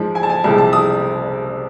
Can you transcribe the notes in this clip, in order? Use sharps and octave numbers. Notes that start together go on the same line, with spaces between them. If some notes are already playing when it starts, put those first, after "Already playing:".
Already playing: G#2 F3 G#3
G#5
A5
G#5
C2 C3 F3 G#3 A5
A5
D#6